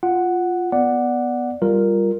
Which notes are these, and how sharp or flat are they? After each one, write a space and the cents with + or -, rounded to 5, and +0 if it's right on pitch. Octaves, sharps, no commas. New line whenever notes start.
F4 +0 F#5 +0
B3 +0 D5 +0 F#5 +0
G3 +0 F4 +0 A#4 +0